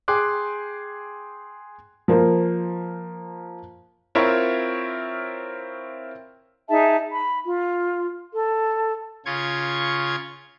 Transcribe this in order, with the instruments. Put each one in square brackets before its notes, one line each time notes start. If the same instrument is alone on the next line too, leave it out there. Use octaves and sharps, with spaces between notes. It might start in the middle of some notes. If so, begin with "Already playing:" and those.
[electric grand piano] G#4 G5 G#5 C6 D6 F#6
[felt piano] F3 A#3 C5
[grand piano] C4 E4 F4 A#4 C#5 E5
[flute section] D#4 G#4 E5 A5
B5
F4
A4
[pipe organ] C#3 F4 C#6 G#6